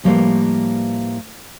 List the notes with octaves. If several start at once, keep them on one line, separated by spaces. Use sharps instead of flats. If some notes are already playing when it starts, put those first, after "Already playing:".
A2 F3 G3 A#3 B4 C5